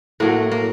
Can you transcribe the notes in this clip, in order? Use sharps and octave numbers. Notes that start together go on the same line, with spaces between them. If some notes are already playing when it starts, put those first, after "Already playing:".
A2 F#3 A3 A#3
A#3